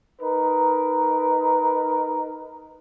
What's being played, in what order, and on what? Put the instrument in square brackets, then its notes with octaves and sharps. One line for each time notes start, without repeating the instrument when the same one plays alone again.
[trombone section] D#4 A#4 B4